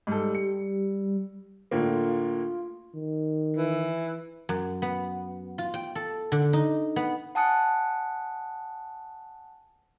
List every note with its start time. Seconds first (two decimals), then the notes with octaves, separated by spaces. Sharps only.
0.07 G#2 G3 A4
0.35 C#7
1.71 A2 D3 A#3 F4
2.95 D#3
3.57 E3
4.49 F#2
4.82 B3
5.58 F4
5.74 G5
5.95 A4
6.32 D3
6.53 D#4
6.96 B3
7.35 F#5 G#5 A5 D#6 F#6 C#7